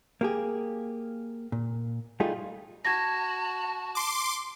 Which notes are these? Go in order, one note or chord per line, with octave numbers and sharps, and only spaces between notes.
A#3 G4 G#4
A#2
G3 A3 D#4 F4 G#4
F#4 A5 G#6 A#6
C6 D6